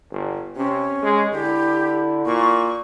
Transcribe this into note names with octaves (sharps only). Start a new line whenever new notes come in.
G1
C3 C#4
G#3
D3 E4 G4
A#2 C#6